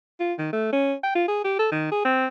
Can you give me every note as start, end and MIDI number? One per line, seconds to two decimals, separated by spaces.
0.20 0.33 65
0.38 0.49 51
0.53 0.68 57
0.73 0.94 61
1.03 1.14 79
1.15 1.24 65
1.28 1.41 68
1.44 1.56 67
1.59 1.69 69
1.72 1.88 51
1.91 2.03 68
2.05 2.27 60